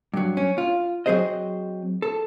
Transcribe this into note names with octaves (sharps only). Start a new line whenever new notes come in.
G2 F#3
C#4
F4
F#3 C4 G#4 C5 D#5
A4